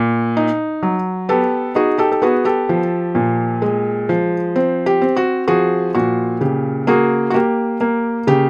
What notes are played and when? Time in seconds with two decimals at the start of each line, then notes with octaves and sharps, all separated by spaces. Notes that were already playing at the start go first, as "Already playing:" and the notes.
Already playing: A#2
0.37 D#4
0.83 F#3
1.29 B3 G4 A4
1.75 D#4 F#4 G#4
1.98 G4 A4
2.12 A4
2.22 B3 F#4 G#4
2.45 G4 A4
2.69 F3
3.15 A#2
3.62 G#3
4.09 F3
4.56 C4
4.86 G4
5.01 C4
5.17 F#4
5.48 F3 F#4 G#4
5.95 A#2 F#4
6.41 C#3 G4
6.87 A#3 F#4 G#4
7.30 F#4
7.34 A#3 G4
7.81 A#3
8.27 C#3 G4